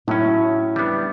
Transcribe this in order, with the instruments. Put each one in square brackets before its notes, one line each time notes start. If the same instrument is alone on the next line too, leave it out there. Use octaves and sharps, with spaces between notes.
[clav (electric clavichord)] A2 F#3 C#4 [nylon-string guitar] E4
[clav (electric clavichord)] G3 B3 D4